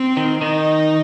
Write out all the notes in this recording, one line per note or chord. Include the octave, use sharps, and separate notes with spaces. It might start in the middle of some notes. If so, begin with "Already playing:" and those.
Already playing: C4
D#3
D#3 D#4